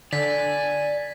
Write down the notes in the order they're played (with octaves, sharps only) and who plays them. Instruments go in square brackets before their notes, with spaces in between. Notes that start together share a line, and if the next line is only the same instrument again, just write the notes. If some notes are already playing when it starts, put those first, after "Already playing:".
[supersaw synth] D3 [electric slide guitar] D5 [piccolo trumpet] G#5 [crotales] B6